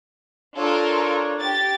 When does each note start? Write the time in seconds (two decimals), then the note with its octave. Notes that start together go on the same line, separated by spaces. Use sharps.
0.57 D4 F4 A4 A#4 C#5
1.40 G4 A6